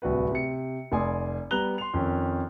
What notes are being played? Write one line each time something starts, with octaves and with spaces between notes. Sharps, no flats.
D1 C2 F#4 B4
C3 C#7
F1 D5 G#5 C6 D#6
G3 B3 A#5 F#6 F7 G7
C6 F7
F2 D#3 C#4